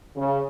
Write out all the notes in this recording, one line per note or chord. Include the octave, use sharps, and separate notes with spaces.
C#3